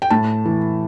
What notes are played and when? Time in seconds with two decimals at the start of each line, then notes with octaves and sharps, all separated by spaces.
0.02 G5
0.10 A2 A5
0.45 E3